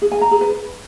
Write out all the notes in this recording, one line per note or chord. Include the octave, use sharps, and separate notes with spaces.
G#4
G#5
A#5
G#4
B4